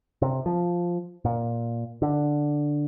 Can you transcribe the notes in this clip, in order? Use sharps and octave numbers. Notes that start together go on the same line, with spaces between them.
C3
F3
A#2
D3